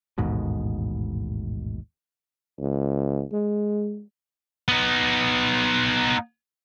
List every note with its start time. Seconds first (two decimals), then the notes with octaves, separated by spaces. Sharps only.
0.18 A1 D#2 G#2 B2
2.59 C#2
3.32 G#3
4.68 B3 D#4